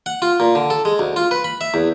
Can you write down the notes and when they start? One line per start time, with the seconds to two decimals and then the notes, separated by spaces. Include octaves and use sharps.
0.06 F#5
0.22 F4
0.40 A#2
0.55 D3
0.70 A4
0.85 G#3
0.99 D2
1.16 F4
1.31 B4
1.44 B5
1.61 E5
1.74 E2